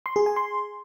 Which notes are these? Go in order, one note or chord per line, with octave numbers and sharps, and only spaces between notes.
C6
G#4
G#5
C6